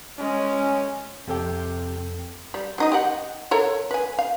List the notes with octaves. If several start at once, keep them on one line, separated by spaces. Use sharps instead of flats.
G#3 C#4
F2 C3 G4 A4 G5
G3
F#3 D#4 D#5
G4 D#5 F#5
A4 A#4 C#5
B4 G#5
F5